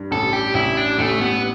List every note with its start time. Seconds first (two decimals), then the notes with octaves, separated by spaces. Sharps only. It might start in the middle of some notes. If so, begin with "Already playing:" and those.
Already playing: G2
0.11 A1 A4
0.33 G4
0.54 A1 E4
0.77 D4
0.98 A1 A3
1.20 B3